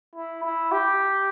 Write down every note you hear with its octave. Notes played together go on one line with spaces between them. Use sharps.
E4
E4
G4